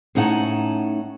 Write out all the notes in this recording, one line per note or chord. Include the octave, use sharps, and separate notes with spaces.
A2 C#4 D#4 F#5 A5